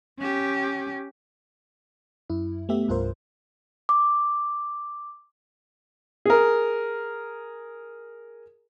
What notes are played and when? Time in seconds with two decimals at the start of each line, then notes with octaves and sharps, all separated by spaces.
0.19 C#4 G4
2.30 F#2 E4
2.69 A3 B3 G4 E5
2.88 C2 G2 F4 A#4 C5
3.89 D6
6.25 G#4 A#4